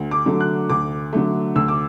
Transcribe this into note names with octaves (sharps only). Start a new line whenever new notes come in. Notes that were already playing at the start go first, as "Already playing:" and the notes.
Already playing: D2
D6
D3 F#3 A3
F#6
D2 D6
D3 F#3 A3
D2 E6
D6